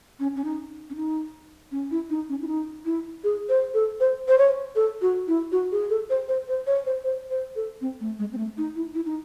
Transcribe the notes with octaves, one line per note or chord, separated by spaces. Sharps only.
C#4
C#4
D#4
C#4
D#4
C#4
E4
D#4
C#4
E4
D#4
E4
G#4
C5
A4
C5
C5
C#5
A4
F#4
E4
F#4
G#4
A4
C5
C5
C5
C#5
C5
C5
C5
A4
C4
A3
G#3
C4
A3
D#4
E4
E4
D#4